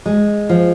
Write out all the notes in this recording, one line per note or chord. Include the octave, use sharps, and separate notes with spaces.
G#3
F3